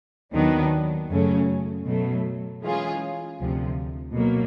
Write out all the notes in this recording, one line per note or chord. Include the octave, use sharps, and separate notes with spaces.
D#2 D#3 F#3 B3 D4
F#2 C#3 F#3 A3 C#4
B2 F#3 A3
E3 G#3 C#4 F4 G#4
D2 C3 F3
B2 F#3 A#3